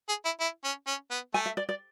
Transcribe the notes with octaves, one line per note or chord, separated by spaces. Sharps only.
G#4
E4
E4
C#4
C#4
B3
A3 G#5
E5
D5
D5